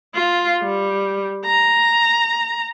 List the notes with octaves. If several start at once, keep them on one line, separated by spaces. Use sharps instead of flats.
F4
G3
A#5